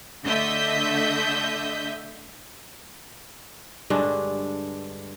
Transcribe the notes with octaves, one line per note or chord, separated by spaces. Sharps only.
D3 A3 D#5 E5 G6
G2 D3 G#3 D4